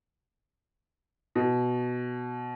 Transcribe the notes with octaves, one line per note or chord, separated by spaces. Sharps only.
B2